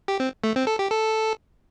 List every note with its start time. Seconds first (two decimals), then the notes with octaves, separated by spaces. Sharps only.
0.08 G4
0.20 C4
0.44 A3
0.56 C4
0.67 A4
0.79 G4
0.91 A4